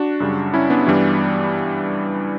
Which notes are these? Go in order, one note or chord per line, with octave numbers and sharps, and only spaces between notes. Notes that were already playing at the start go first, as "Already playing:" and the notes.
Already playing: D4 F#4
F#2 C#3 G3
C#4 E4
B3 D4
G2 E3 G3